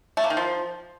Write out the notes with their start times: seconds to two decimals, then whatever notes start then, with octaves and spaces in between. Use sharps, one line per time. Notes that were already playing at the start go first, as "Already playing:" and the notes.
0.17 A3
0.24 A#3
0.30 D#3
0.37 F3